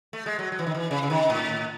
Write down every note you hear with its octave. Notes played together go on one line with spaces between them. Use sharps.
A3
G#3
F#3
F#3
E3
D#3
E3
C#3
C#3
D#3
A2